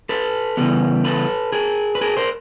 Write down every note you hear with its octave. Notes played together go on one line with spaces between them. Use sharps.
A4 B4
C#3 E3 G3 B3
A4 B4
G#4 A#4
B4
G#4 A#4
A#4 C5